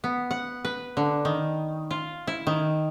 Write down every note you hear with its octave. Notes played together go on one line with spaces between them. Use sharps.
B3
F#5
B4
D3
D#3
F4
E4
D#3